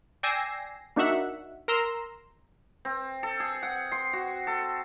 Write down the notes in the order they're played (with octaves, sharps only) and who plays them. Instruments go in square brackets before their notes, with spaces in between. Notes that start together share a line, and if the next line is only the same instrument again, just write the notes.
[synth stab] D5 G5 G#5 E6 A#6 C7
A#3 D4 D#4 F#4 E5 F#5
A#4 A#5 C6 E6
[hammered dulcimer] C4
A4
G#4
F#5
C6
F#4
A4